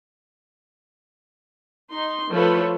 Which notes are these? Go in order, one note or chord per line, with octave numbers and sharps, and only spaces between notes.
D#4 C6
F3 A3 A4 B4 C#5